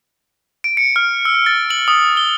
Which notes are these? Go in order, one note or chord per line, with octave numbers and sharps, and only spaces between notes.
D7
C#7
F6
E6
A6
F#7
D#6
G7